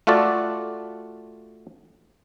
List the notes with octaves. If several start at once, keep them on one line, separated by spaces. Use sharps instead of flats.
A3 F4 F#4 A4 D5